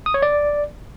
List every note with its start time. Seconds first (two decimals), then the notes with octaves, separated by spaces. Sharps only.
0.06 D#6
0.14 C#5
0.22 D5